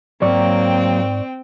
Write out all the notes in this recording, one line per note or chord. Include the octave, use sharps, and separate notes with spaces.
G#2 F#3 A#3 C4 D5 G5 C#6